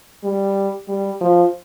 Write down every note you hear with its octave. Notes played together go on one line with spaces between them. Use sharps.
G3
G3
F3